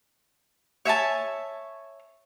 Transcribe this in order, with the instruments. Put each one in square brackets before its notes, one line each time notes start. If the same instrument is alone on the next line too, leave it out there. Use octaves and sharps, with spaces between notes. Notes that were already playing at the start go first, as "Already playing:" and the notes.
[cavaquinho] C#5 E5 G#5 A5